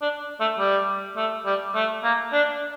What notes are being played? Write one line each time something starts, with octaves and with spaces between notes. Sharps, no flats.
D4
A3
G3
A3
G3
A3
A#3
D4